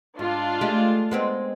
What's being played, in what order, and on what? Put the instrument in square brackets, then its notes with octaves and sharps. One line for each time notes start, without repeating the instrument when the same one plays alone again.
[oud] G#2 [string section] D4 F4
[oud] G#3 A3 G4
G#3 B3 C4